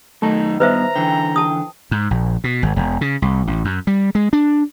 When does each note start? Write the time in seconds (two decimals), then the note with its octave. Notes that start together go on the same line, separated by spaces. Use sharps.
0.22 F#2 D#3 A3 D#4
0.60 G2 D#3 B3 B4 C5 E5 A#5
0.96 D3 E3 G5
1.36 A5 D#6
1.91 G#2
2.11 A#1
2.44 B2
2.63 G#1
2.76 E1
3.01 C#3
3.22 C2
3.47 A1
3.65 F#2
3.87 G3
4.15 G#3
4.33 D4